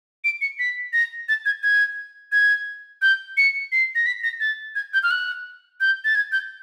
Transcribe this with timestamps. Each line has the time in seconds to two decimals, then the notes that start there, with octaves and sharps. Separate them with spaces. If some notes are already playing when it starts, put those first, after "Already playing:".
0.24 D7
0.41 C#7
0.59 B6
0.93 A#6
1.29 A6
1.46 G#6
1.63 G#6
2.32 G#6
3.02 G6
3.37 C#7
3.72 C7
3.95 A#6
4.06 B6
4.24 A#6
4.40 A6
4.75 G#6
4.93 G6
5.03 F6
5.11 F#6
5.80 G6
6.04 A6
6.15 G#6
6.32 G6